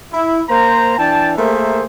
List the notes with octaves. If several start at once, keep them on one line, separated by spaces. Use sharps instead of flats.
E4
A#3 C5 A#5
E3 D4 G5 A5
A3 A#3 G#4 A#4 C5 E5